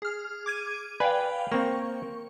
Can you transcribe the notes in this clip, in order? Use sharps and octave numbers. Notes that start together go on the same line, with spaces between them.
G#4 F6
D6 G#6 D#7
B4 D5 F5 G5 G#5
A#3 C4 C#6